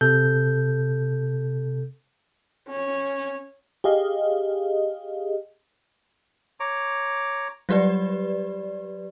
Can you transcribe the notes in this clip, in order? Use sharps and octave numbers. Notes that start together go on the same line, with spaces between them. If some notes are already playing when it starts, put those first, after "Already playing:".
C3 A4 G6
C#4
G4 G#4 D#5 F5
C#5 A#5 D6
F#3 G3 G4 B4 D5